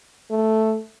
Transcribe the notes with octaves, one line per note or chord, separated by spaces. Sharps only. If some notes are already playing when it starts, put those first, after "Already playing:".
A3